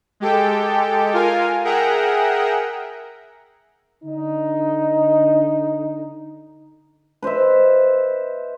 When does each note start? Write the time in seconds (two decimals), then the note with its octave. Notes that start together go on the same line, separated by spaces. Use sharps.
0.20 G#3 G4 A4 G5
1.14 F4 A#4 F5 G#5
1.65 G#4 A#4 E5 F#5 G5 A#5
4.04 D3 D#4
7.22 B4 C5 D#5 E5